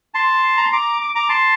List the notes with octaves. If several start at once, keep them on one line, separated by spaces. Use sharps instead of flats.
A5 C6
A#5
C6
A#5 D6
D6
A#5 D6
A5 C6